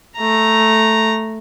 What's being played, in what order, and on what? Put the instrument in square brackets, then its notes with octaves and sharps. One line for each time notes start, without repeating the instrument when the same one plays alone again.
[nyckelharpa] A3 A#5